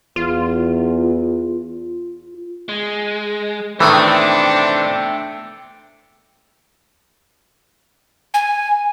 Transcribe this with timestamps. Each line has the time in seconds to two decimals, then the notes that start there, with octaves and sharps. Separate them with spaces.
0.16 E2 F4
2.69 G#3
3.80 A2 D#3 E3 A3 C4 D4 E5 G5
8.34 G#5